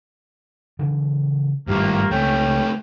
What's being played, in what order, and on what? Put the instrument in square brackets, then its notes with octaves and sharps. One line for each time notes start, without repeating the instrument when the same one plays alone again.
[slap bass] C#3 E3 F3
[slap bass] G#1 [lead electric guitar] G2 F3 [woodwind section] C3 A3 A#3
[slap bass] C#2 [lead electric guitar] A3 C4 [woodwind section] C#4 G5